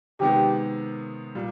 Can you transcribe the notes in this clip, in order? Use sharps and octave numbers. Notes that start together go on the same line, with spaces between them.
C3 D#3 G#3 B3 G4
A#2 G3